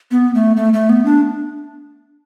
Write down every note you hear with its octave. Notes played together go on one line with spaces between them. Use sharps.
B3
A3
A3
A3
B3
D4